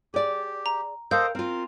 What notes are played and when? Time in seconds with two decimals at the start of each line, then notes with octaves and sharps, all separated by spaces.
0.14 G4 G#4 D5
0.66 A#5
1.11 A4 A#4 C5 D#5 F5 G5 G6
1.35 C4 F4 A#4